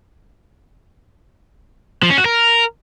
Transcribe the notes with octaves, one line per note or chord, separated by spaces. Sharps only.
F3
C#4
F#4
A#4